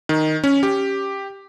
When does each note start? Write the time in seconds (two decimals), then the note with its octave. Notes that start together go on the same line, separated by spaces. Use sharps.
0.09 D#3
0.44 C#4
0.63 G4